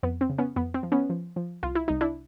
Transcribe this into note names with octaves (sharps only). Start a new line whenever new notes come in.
F2 B3
C4
C#3
B3 C#4
F2 B3
C4
F3
B3 C#4
F3
F3
C2 F4
E4
C2 D#4
D4 E4